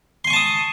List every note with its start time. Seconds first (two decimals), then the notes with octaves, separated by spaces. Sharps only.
0.24 C6
0.27 G#5
0.30 C#6
0.33 A5
0.36 D#6